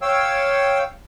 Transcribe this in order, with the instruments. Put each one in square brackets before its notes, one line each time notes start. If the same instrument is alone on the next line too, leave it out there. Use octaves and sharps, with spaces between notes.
[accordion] C#5 F5 G5 E6